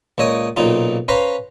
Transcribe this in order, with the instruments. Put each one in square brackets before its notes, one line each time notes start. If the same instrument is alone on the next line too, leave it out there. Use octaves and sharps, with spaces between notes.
[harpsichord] C#2 A#2 C#5 D#5 D#6
B1 A#2 C#3 D#4 F4
C#4 B4 C5 F5 A#5